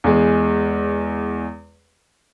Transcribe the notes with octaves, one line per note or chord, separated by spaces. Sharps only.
E2 G#3